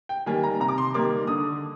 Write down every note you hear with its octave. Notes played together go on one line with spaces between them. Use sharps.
G5
D#3 G3 A#3 G#5
A#5
C3 A#5
D6
C6
D#3 G3 A#3 D6
D3 D#6